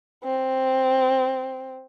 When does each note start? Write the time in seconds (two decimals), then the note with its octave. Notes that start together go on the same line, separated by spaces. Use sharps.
0.24 C4